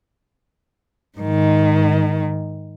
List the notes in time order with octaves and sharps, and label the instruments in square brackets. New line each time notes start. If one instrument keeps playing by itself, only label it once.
[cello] G#2 D#3